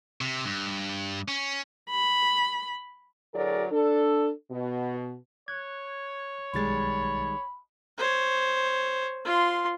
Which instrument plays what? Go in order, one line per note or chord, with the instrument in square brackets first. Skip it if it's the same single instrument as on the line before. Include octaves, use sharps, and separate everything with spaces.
[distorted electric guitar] C3
G2
C#4
[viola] B5
[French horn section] D2 A2 F#3 G#4 A#4 D5
D4 A4
B2
[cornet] C#5 [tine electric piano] F#6 G#6
[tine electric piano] B1 A6 [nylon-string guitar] D#3 G3 G#3 [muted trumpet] B5
[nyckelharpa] C5 C#5
F4 C6